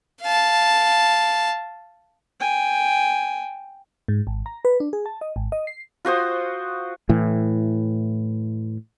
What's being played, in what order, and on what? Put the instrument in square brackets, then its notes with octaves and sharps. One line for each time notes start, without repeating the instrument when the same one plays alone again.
[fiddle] F5 A5
[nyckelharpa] G5 G#5
[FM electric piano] G#2
G#1
A#5
B4
D4
G#4
A5
D#5
G#1
D#5
C7
[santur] F4 F#4 C5 D#6
[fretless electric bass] A2 E3